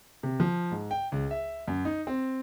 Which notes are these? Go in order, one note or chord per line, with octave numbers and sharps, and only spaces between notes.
C3
F3
G#2
G5
C#2
E5
F#2
D#4
C4